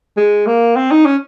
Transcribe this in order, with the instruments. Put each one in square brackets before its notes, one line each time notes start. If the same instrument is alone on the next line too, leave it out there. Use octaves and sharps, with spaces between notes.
[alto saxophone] G#3
A#3
C4
D#4
C#4